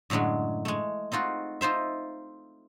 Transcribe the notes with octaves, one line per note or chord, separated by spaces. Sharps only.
F#2 A2 D3 F#3 G#3
G#3 A3
C4 D#4 F4 F#4
D#4 F4 C5 E5